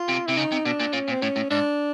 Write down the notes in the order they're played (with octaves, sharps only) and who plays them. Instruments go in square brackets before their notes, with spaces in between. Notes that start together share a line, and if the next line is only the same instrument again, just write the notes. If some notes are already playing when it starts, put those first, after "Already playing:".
Already playing: [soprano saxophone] F4
[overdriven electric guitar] C3
[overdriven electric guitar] C3 [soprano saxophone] E4
[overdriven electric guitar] C#3 [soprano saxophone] D#4
[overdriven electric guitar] C3
[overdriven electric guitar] B2 [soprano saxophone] D4
[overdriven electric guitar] A#2
[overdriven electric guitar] A#2 [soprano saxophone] C#4
[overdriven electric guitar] A#2
[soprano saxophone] C4
[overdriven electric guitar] A2 [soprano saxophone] C#4
[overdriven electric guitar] A2
[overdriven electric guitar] G#2 [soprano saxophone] D4